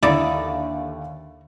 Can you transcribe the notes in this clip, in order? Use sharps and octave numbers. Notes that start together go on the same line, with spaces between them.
D#2 D3 D#4 E4 D5